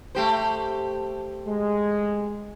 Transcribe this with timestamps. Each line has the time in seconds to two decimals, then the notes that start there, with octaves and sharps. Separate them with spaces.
0.15 A3 G4 C5
1.48 G#3